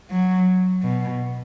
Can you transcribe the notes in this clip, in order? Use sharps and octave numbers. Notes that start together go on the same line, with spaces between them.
F#3
B2